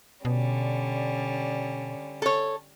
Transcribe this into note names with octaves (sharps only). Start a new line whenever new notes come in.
B2 D3 G3 C#4
A4 C#5